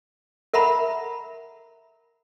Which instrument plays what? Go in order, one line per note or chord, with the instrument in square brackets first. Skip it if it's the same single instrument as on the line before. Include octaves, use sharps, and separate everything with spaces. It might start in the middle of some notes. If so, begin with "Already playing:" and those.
[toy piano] A#4 E5 F#5 A#5 B5